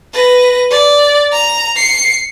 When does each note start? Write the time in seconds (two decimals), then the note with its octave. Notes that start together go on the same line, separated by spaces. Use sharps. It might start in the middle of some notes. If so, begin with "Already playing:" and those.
0.13 B4 A#6
0.70 D5
1.32 A#5
1.76 C7 C#7